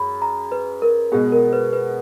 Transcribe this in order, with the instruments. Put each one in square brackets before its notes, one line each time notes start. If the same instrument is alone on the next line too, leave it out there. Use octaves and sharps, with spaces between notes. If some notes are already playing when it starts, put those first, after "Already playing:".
Already playing: [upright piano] F#2 G#3 [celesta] B5
[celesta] A#5
B4
A#4
[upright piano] B2 G#3 B3 [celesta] G#4
[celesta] A#4
B4
B4